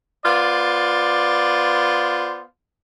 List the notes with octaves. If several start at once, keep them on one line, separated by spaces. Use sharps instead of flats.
B3 F4 C5 D5